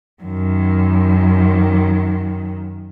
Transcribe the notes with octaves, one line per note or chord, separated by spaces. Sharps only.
F#2 D#3